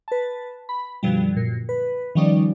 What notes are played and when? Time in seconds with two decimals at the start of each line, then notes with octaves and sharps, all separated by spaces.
0.08 B4 A5
0.69 B5
1.03 F#2 B2 D3 F3 G3
1.33 F#2 A#2
1.69 B4
2.15 D#3 F3 G3 C#4 D#4 D5